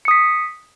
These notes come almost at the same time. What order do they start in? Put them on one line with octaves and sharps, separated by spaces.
C#7 D#6 B6